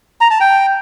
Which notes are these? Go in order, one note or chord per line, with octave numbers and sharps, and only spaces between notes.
A#5
A5
G5